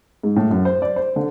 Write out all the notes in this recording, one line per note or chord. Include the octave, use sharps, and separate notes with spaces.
G#2
A2
F#2
C5
D5
C5
D3